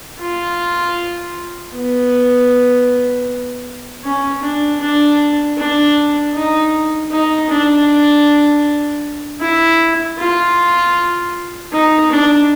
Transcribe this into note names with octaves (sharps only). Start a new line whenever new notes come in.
F4
B3
C#4
D4
D4
D4
D#4
D#4
D4
E4
F4
D#4
D4